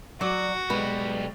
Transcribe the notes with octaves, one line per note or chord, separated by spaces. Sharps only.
F#3 F#4 D5 C#7
B1 B2 G3 G#3 B4